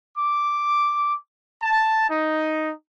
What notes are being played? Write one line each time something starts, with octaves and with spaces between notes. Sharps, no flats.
D6
A5
D#4